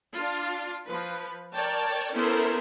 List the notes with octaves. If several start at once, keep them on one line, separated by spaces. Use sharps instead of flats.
D4 F4
F3 B4
A#4 C#5 D5 G5 A5
B3 C#4 E4 A4 A#4 C5